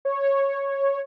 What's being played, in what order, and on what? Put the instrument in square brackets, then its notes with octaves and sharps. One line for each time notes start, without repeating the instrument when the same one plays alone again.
[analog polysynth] C#5